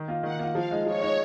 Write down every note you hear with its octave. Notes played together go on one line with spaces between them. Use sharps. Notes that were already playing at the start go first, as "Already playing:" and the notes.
Already playing: D#3
A#3 F4
D#3 F#5
A#3 F4
F3 F5
G#3 D#4
F3 C#5
G#3 D#4